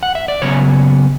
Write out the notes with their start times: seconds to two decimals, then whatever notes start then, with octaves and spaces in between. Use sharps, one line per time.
0.03 F#5
0.15 E5
0.28 D5
0.42 C#3 F#3 B3 C#5